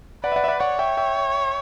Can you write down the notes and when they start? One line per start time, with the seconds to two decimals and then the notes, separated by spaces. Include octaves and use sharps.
0.24 B4 D5 F#5
0.32 E5
0.36 D5 F#5
0.44 E5
0.48 D5 F#5
0.60 C#5 D5 F#5
0.79 E5 G5
0.97 E5 G5